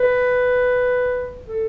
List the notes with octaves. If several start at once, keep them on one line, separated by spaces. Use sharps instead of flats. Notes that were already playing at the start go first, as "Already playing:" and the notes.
Already playing: B4
A4